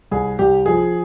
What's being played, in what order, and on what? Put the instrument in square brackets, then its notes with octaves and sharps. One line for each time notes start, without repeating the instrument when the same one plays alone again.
[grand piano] C2 G#4
C2 G4
F3 G#4